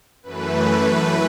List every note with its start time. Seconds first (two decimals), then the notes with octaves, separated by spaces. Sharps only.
0.23 F#2 E3 A3 B4
0.64 B4